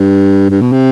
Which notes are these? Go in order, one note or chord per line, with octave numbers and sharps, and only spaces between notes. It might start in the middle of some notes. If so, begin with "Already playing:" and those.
Already playing: G2
G2
B2
C3